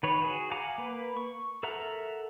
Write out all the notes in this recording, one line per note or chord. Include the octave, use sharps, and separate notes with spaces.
D#3 B4 C#5
F#4 G#4
F5 F#5 G#5 A#5 D6
A#3 B4
C#6
A4 A#4 E5 F#5 A#5